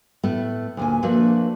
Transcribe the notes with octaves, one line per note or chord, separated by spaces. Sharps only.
A2 A3 B3
D2 A#2 G#5
F3 A3 A#3 D4 F#4 B4